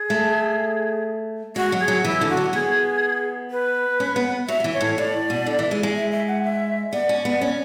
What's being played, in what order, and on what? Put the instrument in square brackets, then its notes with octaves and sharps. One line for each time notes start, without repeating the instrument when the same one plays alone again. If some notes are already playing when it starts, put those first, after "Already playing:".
Already playing: [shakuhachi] G#4
[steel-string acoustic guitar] A3
[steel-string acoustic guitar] G#3 [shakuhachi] F#4
[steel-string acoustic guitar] F#3
[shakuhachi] G#4
[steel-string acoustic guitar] F#3
[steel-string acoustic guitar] E3 [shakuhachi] E4
[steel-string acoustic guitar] D3
[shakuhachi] F#4
[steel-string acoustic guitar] F#3
[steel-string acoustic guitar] B3 [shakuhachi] G#4
[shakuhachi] B4
[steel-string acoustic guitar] C#4
B3
[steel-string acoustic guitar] F#3 [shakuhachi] E5
[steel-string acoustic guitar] F#3
E3
[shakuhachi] C#5
[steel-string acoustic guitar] A2
[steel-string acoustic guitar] A2 [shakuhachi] D5
[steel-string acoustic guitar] B2
D3
E3
G#3
G#3
[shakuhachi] E5
E5
F#5
E5
[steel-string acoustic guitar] B3 [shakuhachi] D5
[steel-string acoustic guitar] C#4
B3
C#4